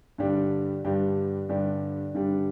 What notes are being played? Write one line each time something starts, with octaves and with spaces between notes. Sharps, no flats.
G2 D3 G3 D4 G4
G2 D3 G3 D4 G4
G2 D3 G3 D4 G4
G2 D3 G3 D4 G4